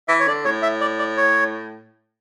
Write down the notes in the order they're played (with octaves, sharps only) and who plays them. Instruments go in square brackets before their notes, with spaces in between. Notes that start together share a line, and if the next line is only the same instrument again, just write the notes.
[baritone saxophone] E3 [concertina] E5
[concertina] C#5
[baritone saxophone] D3 [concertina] D5
[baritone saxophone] A2 [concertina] C#5
[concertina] E5
D5
D5
C#5